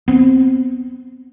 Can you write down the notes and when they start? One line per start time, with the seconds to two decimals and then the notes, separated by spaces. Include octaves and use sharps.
0.08 B3 C4